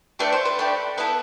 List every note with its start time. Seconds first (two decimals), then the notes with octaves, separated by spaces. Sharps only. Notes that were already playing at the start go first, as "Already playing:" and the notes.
0.19 A3 D4 G4 B4
0.33 C5
0.45 B4
0.59 A3 D4 G4
0.98 B3 E4 A4 B4